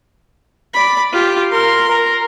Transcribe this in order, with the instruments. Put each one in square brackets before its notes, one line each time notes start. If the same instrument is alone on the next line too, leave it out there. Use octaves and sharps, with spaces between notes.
[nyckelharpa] D5 B5
F4 G4
[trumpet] A#4 [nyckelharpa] C6
[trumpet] A#4